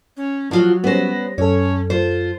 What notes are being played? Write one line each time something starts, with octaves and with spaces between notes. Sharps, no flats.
C#4
F3 F#3 F4 F#4
G3 B3 C#4 C5 A#6
F#2 C#4 A4 C#5
F4 C5